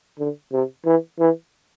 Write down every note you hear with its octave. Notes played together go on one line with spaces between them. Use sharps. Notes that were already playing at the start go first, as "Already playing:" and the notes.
D3
C3
E3
E3